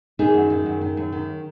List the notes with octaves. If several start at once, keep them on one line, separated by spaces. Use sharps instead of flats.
D#3 D#4 G#4
F#2
D#3
F#2
D#3
F#2
D#3